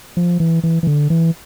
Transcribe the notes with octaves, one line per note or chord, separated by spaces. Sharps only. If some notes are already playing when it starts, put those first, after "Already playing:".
F3
E3
E3
E3
D3
E3